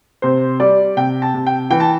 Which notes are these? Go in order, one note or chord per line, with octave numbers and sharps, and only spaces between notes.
C3 C5
G3 D5
C3 G5
A5
C3
G5
E3 G5
A5